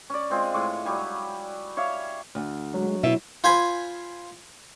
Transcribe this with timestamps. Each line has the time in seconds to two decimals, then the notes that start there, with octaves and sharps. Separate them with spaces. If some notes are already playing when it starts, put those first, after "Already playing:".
0.10 C#4 D5
0.30 G#3 C4 F4 G#4
0.54 A2 G#3 C#6 D6
0.85 F#3 G3 G#5
1.77 C#5 E5 F5 D6
2.35 D2
2.74 F#3 G#3 F#4
3.03 B2 E4 E5
3.44 F4 C5 G#5 B5